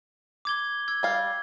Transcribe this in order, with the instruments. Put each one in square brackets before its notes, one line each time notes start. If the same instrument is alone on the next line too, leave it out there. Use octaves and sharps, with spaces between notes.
[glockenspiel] D6 G#6 G7
E6 G#6
[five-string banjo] G3 F5